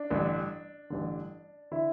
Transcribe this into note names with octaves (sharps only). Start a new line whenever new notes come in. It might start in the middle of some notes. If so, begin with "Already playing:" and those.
Already playing: D4
A1 G2 D3
A1 G2 D3
D3 E4